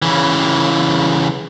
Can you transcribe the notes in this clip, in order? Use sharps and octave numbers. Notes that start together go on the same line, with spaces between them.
C#3 E3